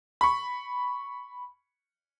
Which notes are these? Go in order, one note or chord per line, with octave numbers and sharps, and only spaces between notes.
B5 C#6